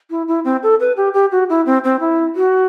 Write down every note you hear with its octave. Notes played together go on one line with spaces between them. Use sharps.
E4
E4
C4
A4
B4
G4
G4
F#4
E4
C4
C4
E4
F#4